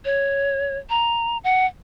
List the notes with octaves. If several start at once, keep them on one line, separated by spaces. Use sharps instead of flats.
C#5
A#5
F#5